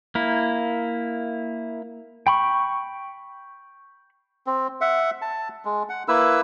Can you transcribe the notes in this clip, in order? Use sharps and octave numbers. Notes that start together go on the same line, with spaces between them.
A#3 E4
G5 B5 C#6
C4
E5 F#5
A5
G#3
F#5
A#3 E4 B4 E6